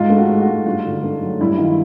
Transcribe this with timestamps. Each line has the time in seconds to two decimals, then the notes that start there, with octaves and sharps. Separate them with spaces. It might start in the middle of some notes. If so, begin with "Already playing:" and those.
Already playing: G#2 F4
0.10 A3
0.17 F#4
0.29 G#2
0.41 F#4
0.47 G#2
0.66 G2 F4
0.85 D3
1.04 A3
1.22 F#3
1.41 G2 E4
1.59 D#3 F4